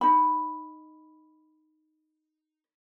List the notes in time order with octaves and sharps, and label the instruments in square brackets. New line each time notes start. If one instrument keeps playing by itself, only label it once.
[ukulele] D#4 B5